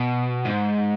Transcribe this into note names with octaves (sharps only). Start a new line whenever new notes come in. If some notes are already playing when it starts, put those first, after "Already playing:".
Already playing: B2
G#2